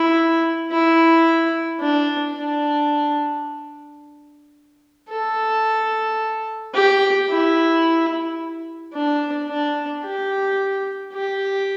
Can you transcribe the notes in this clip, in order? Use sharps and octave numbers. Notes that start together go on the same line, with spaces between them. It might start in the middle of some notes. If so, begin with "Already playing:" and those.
Already playing: E4
E4
D4
D4
A4
G4
E4
D4
D4
G4
G4